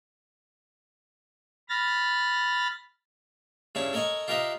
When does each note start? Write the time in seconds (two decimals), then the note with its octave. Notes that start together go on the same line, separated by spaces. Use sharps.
1.69 B5 F6 A6 A#6
3.75 G2 C#3 E4 C#5 A5
3.93 A4 A#4 D#5 G#5 C#6
4.28 F4 G4 A#4 B4 D#5 E5